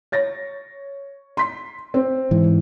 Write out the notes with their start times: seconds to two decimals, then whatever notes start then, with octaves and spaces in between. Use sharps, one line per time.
0.12 C#5 A6 A#6
1.37 C6 B6
1.94 C4
2.31 G#2 E3